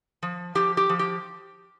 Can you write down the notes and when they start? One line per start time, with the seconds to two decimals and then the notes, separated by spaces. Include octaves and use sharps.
0.23 F3
0.55 F3 G4
0.77 G4
0.89 F3
0.99 G4